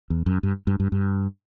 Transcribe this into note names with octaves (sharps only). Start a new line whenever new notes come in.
E2
F#2
G2
G2
G2
G2